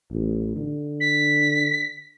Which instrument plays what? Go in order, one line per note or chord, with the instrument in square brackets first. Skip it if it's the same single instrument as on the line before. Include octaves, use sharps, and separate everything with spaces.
[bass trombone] A1
D3
[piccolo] B6